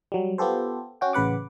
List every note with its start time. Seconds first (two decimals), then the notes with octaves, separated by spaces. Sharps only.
0.12 F#3 G3
0.38 B3 F4 G4 A4 C5
1.01 C#4 F#4 G5
1.13 A1 C#3 B4 F#5 D6